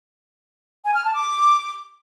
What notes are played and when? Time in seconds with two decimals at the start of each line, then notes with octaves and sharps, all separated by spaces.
0.84 G#5
0.94 F6
1.03 A5
1.13 D6